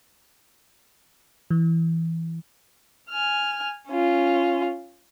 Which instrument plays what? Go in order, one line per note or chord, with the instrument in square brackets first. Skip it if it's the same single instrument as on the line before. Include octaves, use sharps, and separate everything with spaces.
[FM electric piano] E3
[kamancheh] G#5 F6
C#4 F4